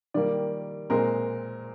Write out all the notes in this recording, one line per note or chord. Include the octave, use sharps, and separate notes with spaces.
D#3 G3 A#3 D5
A#2 G#3 C4 A#4